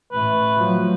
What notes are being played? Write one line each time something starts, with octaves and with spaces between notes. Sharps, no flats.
A1 A3 B4
F3 F#3